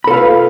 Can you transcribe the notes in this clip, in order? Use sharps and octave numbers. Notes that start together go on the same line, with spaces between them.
F4 A4 B4 F5 B5